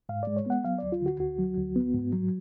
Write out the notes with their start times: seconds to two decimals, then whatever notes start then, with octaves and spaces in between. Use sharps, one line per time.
0.09 G#2 F5
0.23 G#3 D5
0.37 C#5
0.46 B3 F#5
0.64 F#3 F5
0.78 D2 D5
0.92 F4
1.01 D3 F#4
1.20 D2 F#4
1.38 F#3
1.57 D2
1.76 B3
1.94 G#2
2.13 F#3